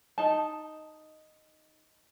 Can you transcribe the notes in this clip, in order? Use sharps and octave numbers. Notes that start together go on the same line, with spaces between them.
D#4 A5